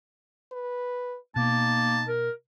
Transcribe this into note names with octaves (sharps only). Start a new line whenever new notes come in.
B4
B2 A#3 D#4 A5
A#4